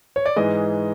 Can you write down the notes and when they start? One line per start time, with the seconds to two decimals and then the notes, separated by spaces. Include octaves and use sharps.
0.16 C#5
0.26 D5
0.36 G#2 E3 G#3 D#5